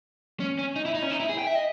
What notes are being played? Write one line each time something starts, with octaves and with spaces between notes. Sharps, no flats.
C#4
C#4
D#4
E4
D#4
C#4
D#4
E4
G#4
G5
E5
D#5